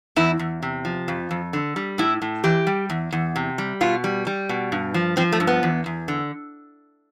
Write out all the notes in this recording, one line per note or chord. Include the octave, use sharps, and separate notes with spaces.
E2 E4
E2
C3
F3
F2
F2
D3
G3
A2 E4
A2
E3 G4
G3
E2
E2
C3
G3
B2 F4
G3
G3
B2
G2
F3
F3 C4
A3
G2
B3
E2
E2
D3